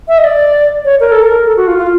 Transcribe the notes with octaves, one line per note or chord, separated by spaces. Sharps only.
E5
D#5
D5
C#5
A#4
A4
A#4
A4
F#4
F4
F4